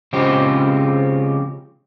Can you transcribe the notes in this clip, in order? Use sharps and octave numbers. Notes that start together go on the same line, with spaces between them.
C#3 F3 G#3 C4 G4